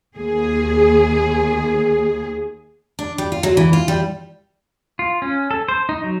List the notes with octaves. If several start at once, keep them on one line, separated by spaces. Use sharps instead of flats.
D#2 G#4
D4
G3
F4
F#3
E3
F4
G3
F4
C#4
A4
C5
D#4
F#3